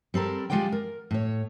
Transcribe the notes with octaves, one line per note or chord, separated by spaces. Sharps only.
G3 C4 A4 A#4
G3 G#3 F4 A#4 D5 G5
A#4
A2 C#5